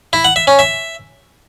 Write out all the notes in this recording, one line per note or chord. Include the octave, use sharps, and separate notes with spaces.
E4
F#5
E5
C#4
E5